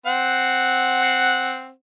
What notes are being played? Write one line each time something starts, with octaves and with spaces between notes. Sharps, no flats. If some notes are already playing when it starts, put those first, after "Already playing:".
C4 F#5